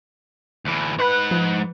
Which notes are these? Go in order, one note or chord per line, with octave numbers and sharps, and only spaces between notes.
D2 E3
G#2 B4 F#5 B5 F#6
F3